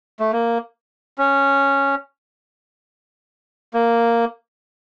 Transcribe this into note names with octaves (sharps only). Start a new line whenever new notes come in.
A3
A#3
C#4
A#3